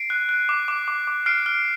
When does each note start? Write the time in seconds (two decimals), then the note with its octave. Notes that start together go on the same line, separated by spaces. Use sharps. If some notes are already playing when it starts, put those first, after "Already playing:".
Already playing: C7 D7
0.10 F#6
0.29 F#6
0.49 D6
0.68 D6
0.88 D6
1.07 D6
1.26 F6 C7 D7
1.46 F6